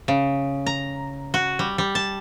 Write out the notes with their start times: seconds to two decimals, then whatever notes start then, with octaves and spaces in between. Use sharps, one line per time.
0.08 C#3
0.66 A#5
1.34 F#4
1.59 G3
1.78 G3
1.95 A5